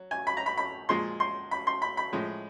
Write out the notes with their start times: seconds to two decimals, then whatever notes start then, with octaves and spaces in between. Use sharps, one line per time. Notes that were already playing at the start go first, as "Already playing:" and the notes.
Already playing: F#3
0.11 G#5
0.27 B5
0.37 A#5
0.46 B5
0.57 B5
0.89 A#2 F3 G#3 C6
1.20 C6
1.51 B5
1.67 C6
1.82 B5
1.97 B5
2.13 A2 F3 G#3